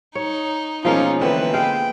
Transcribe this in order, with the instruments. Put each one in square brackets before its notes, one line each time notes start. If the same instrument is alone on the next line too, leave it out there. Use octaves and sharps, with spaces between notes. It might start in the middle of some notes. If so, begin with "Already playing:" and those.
[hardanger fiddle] D#4 [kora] C#5
[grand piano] B2 [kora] F3 G#3 A#3 [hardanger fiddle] C#4 D#4 [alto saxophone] F4
[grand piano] D3 B3 C4 [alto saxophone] E3 [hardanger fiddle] B4
[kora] G#3 F5 [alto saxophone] G5